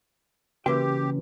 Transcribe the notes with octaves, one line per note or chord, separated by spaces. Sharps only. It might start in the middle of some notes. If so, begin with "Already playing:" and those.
C#3 E3 A#3 F#4 G4 B4 G5